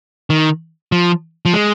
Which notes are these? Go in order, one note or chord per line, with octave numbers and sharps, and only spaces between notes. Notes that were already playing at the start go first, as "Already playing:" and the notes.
D#3
F3
F3
G#3